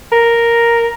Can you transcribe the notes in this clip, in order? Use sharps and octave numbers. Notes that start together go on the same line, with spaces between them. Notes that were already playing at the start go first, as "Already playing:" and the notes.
A#4